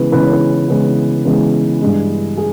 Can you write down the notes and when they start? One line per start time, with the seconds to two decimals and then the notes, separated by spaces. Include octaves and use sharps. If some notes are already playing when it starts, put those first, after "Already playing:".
Already playing: C#3 E3 G#3 B3 B4
0.12 C#3 E3 G#3 B3 B4
0.23 C#5
0.33 B4
0.68 C#3 E3 G#3 B3
1.25 C#3 E3 G#3 B3
1.81 G2 E3 G#3
2.37 G#4